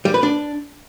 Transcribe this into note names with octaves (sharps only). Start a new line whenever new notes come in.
G3
B4
D4